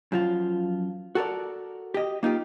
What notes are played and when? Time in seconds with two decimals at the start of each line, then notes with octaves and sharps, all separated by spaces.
0.12 F#2 F3 F4
1.15 F#4 A4 A#4 D5
1.94 G4 D#5
2.23 A#3 D#4 F4 G4